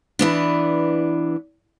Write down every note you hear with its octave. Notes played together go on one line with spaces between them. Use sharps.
E3 B3 D4